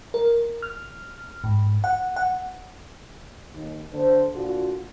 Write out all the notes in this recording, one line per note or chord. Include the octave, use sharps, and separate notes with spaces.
A#4
F6
G#2
F#5
F#5
D#2
D3 C5
A#2 D3 F4 F#4